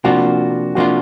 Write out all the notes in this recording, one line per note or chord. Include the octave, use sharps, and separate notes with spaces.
C3 F3 A#3 D4 F4 F#4
C3 F3 A#3 D4 F4 F#4